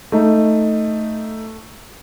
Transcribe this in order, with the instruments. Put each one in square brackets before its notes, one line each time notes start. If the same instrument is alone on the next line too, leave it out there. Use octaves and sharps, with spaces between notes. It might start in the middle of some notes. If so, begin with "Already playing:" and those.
[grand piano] A3 D#4